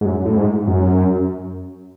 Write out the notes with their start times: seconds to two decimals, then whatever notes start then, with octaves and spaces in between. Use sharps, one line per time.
0.01 G#2
0.06 F#2
0.25 A2
0.36 G#2
0.68 F#2